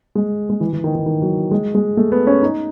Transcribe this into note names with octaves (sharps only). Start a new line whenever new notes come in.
G#3
G#3
E3
E3
D#3
D#3
D#3
F#3
G#3
G#3
A3
B3
C#4
D#4